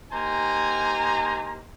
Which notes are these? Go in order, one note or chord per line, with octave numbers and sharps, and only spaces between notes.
A#3 D#4 G4 C5 G#5 A#5